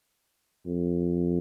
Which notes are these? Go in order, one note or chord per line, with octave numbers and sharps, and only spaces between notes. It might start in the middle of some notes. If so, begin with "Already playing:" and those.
F2